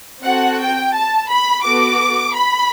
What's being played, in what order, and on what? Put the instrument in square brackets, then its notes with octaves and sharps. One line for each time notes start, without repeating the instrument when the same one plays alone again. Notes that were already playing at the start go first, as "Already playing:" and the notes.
[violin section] C4 F#4 A4 F#5
G5
A5
B5
B3 F#4 A4 D6
B5